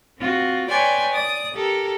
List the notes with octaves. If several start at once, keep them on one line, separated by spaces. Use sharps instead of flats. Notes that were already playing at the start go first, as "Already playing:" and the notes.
C4 F4 F#4
B4 C#5 D5 G5 G#5 C6
D5 D#6
G4 A4 A#4